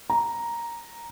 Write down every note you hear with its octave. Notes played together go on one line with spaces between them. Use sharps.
A#5